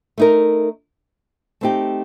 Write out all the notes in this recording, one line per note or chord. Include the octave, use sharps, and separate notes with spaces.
A3 D#4 A#4
A3 C4 D#4 G4